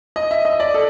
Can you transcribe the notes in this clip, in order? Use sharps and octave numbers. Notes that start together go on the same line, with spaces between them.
D#5
E5
D#5
D5
A4